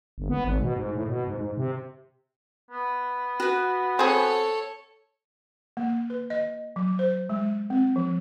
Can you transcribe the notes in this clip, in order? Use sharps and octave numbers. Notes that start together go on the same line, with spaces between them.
G1
B3
G#1
B2
G#2
A2
B2
G#2
G#2
C3
B3
F#4 B4
C4 G#4 A4 C#5
A#3
B4
D#5
F#3
C5
G#3
C4
F3